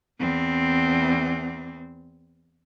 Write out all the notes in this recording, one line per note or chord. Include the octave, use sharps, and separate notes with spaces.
E2 C4